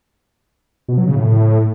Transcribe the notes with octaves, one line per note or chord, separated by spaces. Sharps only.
B2
F#3
C#3
A2